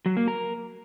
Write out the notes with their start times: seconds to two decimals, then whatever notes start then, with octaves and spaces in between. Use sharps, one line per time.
0.06 F#3
0.17 A#3
0.28 A#4